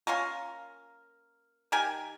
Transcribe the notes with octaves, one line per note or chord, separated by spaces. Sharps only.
A#3 C#4 F4 A#4
D#3 G4 A#4 G#5